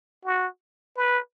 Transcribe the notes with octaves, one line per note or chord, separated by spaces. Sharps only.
F#4
B4